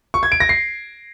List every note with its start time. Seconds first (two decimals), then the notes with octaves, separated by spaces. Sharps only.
0.14 C#6
0.23 G#6
0.32 D7
0.40 A#6
0.49 C7